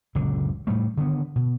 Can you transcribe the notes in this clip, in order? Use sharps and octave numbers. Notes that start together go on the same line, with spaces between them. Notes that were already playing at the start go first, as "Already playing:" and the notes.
F#1 C#2 A#2 D3
A2 G3 A3
D3 D#3 B3
B2